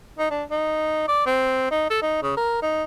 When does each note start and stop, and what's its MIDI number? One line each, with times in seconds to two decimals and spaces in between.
0.19 0.29 63
0.31 0.43 62
0.51 1.05 63
1.08 1.25 74
1.26 1.67 60
1.71 1.89 63
1.90 1.99 69
2.02 2.20 63
2.23 2.32 49
2.37 2.61 70
2.62 2.84 63